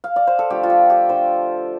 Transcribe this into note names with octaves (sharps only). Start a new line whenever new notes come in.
F5
D5
C5
A4
D3 F3 A3 G4
F4
G4
G4
D3 F3 A3 C5